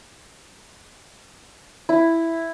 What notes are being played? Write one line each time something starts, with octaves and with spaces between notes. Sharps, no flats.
E4